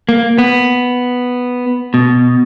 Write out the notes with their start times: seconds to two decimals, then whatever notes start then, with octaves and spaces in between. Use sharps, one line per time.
0.09 A#3
0.38 B3
1.94 B2